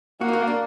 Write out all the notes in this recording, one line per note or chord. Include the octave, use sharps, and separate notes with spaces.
A#3 F#4
D#4
F#4
D4